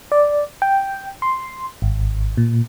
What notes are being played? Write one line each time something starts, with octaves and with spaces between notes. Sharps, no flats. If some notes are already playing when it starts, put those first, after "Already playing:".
D5
G5
C6
G#1
A#2